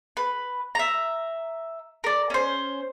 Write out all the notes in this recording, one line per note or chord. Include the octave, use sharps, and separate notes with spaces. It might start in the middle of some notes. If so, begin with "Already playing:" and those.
B4
E5 A#5
A#4 D5
C#4 C5